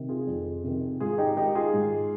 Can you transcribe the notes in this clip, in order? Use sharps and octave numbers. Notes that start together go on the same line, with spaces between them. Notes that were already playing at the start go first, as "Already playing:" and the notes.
Already playing: C3 D#3
F4 G#4
F2
C3 D#3
G#2 F4 G#4
D#4 G4
D#3 D#4 G4
F4 G#4
G#2